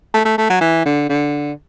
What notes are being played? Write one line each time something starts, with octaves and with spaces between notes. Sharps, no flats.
A3
A3
A3
F#3
E3
D3
D3